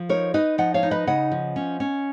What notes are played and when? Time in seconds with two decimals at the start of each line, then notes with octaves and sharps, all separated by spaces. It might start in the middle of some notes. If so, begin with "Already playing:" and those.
Already playing: F3
0.09 D#4 A#4 C#5
0.34 D#4 B4 D#5
0.58 F3 D#5 F#5
0.74 C#5 F5
0.83 D#4
0.91 B4 D#5
1.07 C#3 D#5 F#5
1.31 F3
1.56 C#4
1.80 C#4